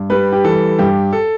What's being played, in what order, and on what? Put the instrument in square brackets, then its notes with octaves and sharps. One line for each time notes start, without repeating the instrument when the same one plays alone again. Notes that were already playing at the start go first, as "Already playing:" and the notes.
Already playing: [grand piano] G2
G3 B4
G4
E3 A4
G2 G4
A4